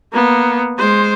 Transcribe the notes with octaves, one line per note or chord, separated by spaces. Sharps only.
A#3 B3
G#3 C5